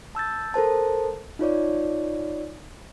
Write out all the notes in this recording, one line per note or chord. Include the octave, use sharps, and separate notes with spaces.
A5 E6 G6 A6
A4 A#4 C5 A5
D#4 F4 C#5 D5